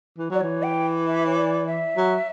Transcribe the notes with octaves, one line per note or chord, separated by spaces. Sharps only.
E3
F#3 D5
E3 C#5
G5
E5
C#5
D5
E5
F#3